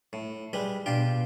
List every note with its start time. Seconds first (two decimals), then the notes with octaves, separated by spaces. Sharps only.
0.13 A2
0.53 G3 G#3 B4
0.86 B2 D4 F4 G4